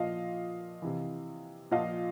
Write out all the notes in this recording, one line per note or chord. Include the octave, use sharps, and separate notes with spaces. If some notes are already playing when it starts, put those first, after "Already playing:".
Already playing: A#2 F3 D#5 F5
C3 E3
A#2 F3 D#5 F5